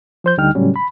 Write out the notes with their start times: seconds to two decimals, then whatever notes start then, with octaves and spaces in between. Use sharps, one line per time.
0.24 F3 C5 G6
0.38 D2 D3 G3 D#4 G5 F6
0.55 A2 C#3 F#3 G3 A3 C#4
0.76 B5